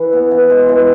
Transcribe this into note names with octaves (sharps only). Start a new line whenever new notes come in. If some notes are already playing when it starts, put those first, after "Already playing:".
Already playing: E3
B3
E3
G#3
E3